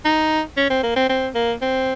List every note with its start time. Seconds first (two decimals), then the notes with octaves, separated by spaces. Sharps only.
0.05 D#4
0.57 C#4
0.70 C4
0.83 A#3
0.96 C4
1.09 C4
1.35 A#3
1.62 C4